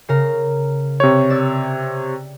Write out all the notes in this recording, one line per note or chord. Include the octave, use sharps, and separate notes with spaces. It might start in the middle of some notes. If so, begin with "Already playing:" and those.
C#3 A#4 A#5
C3 G4 C#5
D5 E6